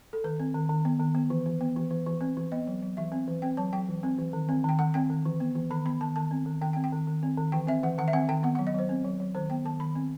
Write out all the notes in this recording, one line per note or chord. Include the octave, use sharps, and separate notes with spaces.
A4
D#3 B4
C4
D#3
D#3
B3
D#3
B3
E3
E3
B3
E3
E3
E3
C4
E3
B3 D#5
F#3
F#3
E3 E5
C4
E3
C4 G5
F#3 A5
F#3 G5
E3
C4
E3
D#3
C4
D#3 G5
D#3 F#5
C4 G5
D#3
E3
B3
E3
D#3 B5
B3 B5
D#3 A5
D#3 A5
C4
D#3
D#3 G5
G5
C4
G5
D#3
D#3
C4
D#3
E3 G5
C4 E5
E3 F#5
D#3 F#5
E5
C4 F#5
D#3 G5
B3 F#5
F#3 F#5
D#5
F#3 C5
C4
F#3
F#3
D#3 C5
B3 G5
D#3 A5
D#3 B5
C4